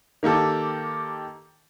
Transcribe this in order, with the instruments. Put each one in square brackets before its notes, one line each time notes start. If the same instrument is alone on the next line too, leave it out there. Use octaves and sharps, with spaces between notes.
[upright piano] D#3 A#3 G4 A4